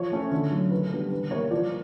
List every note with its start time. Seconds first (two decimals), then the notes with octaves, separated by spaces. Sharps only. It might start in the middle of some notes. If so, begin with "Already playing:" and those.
Already playing: F3 C#5
0.12 A3 C#4
0.31 D3
0.51 F#3 A3
0.71 D#3 B4
0.91 G3 B3 D4
1.12 D3 B4
1.31 G3 A#3 C#5
1.51 F3 D5